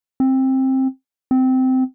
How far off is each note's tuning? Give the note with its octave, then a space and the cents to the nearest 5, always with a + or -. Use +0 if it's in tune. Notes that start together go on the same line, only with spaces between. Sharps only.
C4 +15
C4 -15